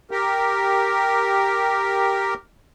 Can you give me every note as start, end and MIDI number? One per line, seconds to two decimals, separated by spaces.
0.11 2.34 67
0.11 2.34 70